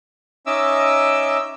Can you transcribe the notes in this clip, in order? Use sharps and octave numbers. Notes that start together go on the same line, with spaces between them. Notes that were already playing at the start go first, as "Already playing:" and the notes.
C#4 D#4 D#5 E5 D6 E6